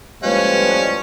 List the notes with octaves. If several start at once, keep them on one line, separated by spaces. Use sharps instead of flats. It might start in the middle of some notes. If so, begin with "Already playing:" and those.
A2 F3 G3 G#3 A#3 C#4 B4